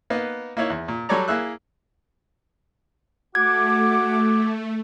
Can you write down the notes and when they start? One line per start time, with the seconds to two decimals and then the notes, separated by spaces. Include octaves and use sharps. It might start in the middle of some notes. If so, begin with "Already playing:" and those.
0.10 A#3 B3 D#4 B4
0.57 A#3 D#4 E4 C#5
0.70 E2
0.88 A#2
1.09 F#3 G3 A4 C#5 D5 A#5
1.28 A#3 E4 G#4 E5 F#6
3.35 A3 F#4 F#5 D6 G#6